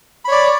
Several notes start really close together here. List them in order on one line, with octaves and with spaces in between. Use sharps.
B5 C#5 D5